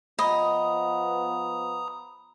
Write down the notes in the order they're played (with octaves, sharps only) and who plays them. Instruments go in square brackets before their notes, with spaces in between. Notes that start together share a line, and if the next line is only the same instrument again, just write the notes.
[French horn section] F3 B3 [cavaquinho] D#5 [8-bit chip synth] A#5 D#6 [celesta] B5